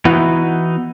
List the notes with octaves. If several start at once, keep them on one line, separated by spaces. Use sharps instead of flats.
E3 B3 D#4 E4 F#4